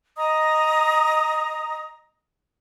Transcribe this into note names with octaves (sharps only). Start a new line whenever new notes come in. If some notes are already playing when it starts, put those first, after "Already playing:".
D#5 A#5 D#6